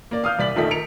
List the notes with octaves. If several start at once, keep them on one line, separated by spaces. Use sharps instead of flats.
A#3 D5
F5 D#6 F6 G6
C2 D5 B6 F#7
A#1 F2 D#3 A3 A4 B6
A#4 C#7 D7 F7